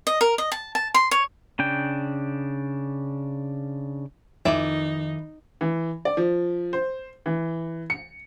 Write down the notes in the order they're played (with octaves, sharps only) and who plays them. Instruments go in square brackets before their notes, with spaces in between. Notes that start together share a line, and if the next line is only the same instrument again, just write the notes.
[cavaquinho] D#5
A#4
D#5
A5
A5
C6
C#5
[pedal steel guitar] C#3 D4 G5
[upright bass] F2 D#3 [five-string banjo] E3 D5 E5 [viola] D#4
[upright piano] E3
D5
F3
C5
E3
C#7